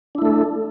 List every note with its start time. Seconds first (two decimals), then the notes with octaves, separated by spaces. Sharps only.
0.15 D4
0.18 E4
0.22 A3
0.25 A4